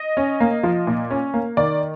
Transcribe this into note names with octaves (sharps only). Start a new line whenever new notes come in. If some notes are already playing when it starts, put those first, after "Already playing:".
Already playing: D#5
C#4
A#3
F3
A#2
C#4
A#3
D#3 D5